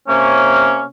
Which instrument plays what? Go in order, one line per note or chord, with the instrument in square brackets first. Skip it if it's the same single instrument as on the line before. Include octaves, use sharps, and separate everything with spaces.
[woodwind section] C3 A#3 C#4